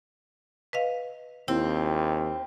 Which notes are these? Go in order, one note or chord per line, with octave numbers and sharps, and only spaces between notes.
B4 D#5 F5
D#2 C4 E4